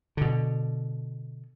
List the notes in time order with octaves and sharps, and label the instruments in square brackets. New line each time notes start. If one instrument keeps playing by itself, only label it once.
[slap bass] B2 D3